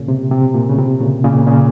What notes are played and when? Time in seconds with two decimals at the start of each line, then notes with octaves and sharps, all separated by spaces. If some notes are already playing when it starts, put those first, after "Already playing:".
Already playing: A#2 C#3
0.08 C3
0.31 C3
0.54 A#2
0.70 C#3
0.78 C3
1.00 A#2 C#3
1.24 A#2 C#3
1.47 A#2 C#3